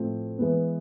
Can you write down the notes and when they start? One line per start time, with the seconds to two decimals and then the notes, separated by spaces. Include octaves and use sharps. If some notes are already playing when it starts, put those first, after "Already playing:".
Already playing: A2 F3 A3 C4
0.38 E3 G#3 B3